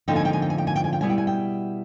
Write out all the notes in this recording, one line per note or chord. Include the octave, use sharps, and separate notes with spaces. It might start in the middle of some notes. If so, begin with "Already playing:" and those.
F2 D3 F3 A#3 D#4 G5
G#5
G5
G#5
G5
G#5
G5
G#5
G5
G#5
G5
B2 G3 B3 E4 G#5
G5
G#5
G5